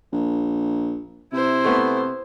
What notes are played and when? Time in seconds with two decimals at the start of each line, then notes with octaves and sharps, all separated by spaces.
0.12 A#1
1.33 C3 E4 C5
1.64 A3 B3